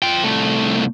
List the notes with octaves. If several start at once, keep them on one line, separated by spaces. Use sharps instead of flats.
F4 G5
C2 A3